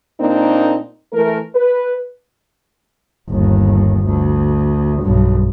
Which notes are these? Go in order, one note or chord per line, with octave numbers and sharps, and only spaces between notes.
A#2 A#3 C4 D4 D#4
E3 A3 A#4
B4
G1 D#2
D2
B1 G2